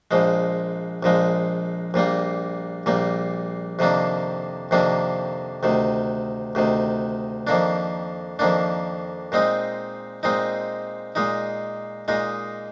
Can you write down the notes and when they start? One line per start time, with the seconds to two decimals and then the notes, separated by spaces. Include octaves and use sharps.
0.11 A#1 A#2 F3 G#3
1.03 A#1 A#2 F3 G#3
1.94 A#1 A#2 G3 A#3
2.86 A#1 A#2 G3 A#3
3.79 F2 C3 D#3 A#3 D4
4.71 F2 C3 D#3 A#3 D4
5.63 D2 C3 D#3
6.55 D2 C3 D#3
7.47 F2 D#3 A#3 D4
8.39 F2 D#3 A#3 D4
9.32 A#2 G#3 C4 D#4
10.23 A#2 G#3 C4 D#4
11.15 A#2 G#3 D#4
12.08 A#2 G#3 D#4